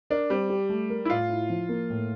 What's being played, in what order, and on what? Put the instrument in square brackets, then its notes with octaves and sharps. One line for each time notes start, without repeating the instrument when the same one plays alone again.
[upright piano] D4 [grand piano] A#4
[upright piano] G3 [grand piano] C4
[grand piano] G4
A3
A#4
[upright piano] E4
[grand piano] A2 [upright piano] F4
[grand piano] E4
F3
A#3
A2